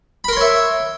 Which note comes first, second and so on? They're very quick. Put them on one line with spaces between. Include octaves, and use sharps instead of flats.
B5 A#4 C6 C#5 E5